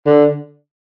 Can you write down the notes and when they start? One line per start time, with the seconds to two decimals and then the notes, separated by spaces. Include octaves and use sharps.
0.06 D3